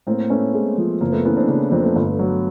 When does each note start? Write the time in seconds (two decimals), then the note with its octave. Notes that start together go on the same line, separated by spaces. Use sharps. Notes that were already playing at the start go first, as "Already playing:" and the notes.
0.07 A2 A#3 C4
0.30 A3 B3 C#4
0.54 G#3
0.78 F3
1.01 F#1 A#3 C4
1.12 A3 B3
1.25 E3 B3 C#4
1.37 C4 D4
1.48 C#3 C4 D4
1.72 F2 A#3 C4
1.83 A3 B3
1.95 G1
2.19 F#3